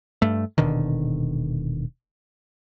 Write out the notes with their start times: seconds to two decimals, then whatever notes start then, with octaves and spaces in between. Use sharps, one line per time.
0.22 G2 A3
0.58 D#1 B2 D3 D#3